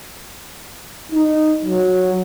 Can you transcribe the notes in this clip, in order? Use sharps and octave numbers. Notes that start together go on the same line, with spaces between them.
D#4
F#3